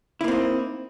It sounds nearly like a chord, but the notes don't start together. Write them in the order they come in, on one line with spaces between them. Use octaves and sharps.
E4 A#3 C4 D#4